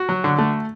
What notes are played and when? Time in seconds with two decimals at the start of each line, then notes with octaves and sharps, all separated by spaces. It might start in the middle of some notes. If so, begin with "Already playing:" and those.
Already playing: F#4
0.09 F#3
0.24 D3
0.38 A3